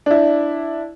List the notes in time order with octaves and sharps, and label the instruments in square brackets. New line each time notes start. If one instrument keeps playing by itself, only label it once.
[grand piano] D4 E4